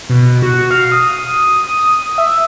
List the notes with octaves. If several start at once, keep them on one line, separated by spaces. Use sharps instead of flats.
B2
F#4
F5
D#6
E5